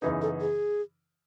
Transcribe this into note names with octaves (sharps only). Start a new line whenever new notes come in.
F#2 C#3 E3 B3 D#4 B4
A4
G#4